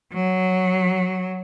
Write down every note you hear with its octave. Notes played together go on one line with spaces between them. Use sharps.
F#3